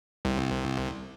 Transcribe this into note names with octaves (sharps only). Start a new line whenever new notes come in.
C2